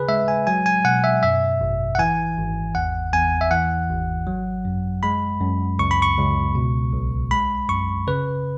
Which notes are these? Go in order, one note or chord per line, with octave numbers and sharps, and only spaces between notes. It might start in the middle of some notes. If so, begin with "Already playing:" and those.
Already playing: C#3 G#4 B4
G#3 E5
G#5
F#3 G#5
G#5
B2 F#5
E5
F#2 E5
G#1
F#5
E3 G#5
G#1
E2 F#5
E2 G#5
E5
E3 F#5
G#1
F#3
F#2
G#3 B5
F#2
C#2 C#6
B5
C#6
C#2
B2
B1
G#3 B5
F#2 C#6
C#3 B4